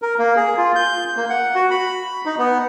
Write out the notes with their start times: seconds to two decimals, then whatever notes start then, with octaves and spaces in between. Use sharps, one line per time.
0.02 A#4
0.19 A#3
0.36 G#4
0.57 F4
0.75 G6
1.17 A#3
1.30 F#5
1.55 F#4
1.71 B5
2.25 D#4
2.38 B3